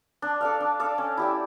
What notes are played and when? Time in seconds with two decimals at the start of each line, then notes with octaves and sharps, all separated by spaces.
0.22 D4
0.41 A4 D5 F5
0.60 D4
0.80 A4 D5 F5
0.98 C#4
1.17 E4 G4 D5